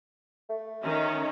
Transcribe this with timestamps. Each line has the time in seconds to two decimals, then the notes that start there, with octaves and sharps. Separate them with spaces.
0.49 A3
0.82 D#3 C#4 D#4